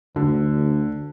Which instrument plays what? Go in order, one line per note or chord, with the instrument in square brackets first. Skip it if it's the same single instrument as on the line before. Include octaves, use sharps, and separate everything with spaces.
[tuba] D2 [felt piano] D3